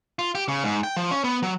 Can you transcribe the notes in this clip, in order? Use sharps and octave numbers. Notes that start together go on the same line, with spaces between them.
F4
G4
C#3
G#2
G5
F3
C#4
B3
F#3